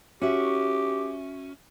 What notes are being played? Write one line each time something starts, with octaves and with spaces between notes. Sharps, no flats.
C#4 F#4 G4 E5